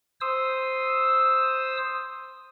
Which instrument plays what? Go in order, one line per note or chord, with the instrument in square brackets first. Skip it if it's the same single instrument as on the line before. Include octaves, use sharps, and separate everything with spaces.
[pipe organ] C5 D#6 E6